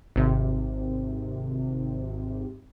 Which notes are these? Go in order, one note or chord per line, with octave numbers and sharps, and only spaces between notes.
G#1 C3